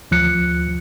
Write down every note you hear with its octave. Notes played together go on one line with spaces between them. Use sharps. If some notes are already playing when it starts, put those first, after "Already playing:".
D2 F3 F#6 C#7